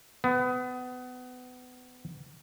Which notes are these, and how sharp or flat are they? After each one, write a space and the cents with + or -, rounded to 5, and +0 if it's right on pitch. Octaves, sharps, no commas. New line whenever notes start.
B3 +25